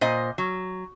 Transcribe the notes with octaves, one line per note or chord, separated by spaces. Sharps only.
A#2 C5 D#5
F#3